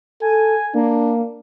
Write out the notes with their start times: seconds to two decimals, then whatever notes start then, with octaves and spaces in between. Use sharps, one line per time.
0.22 A4 G#5
0.75 A#3 D4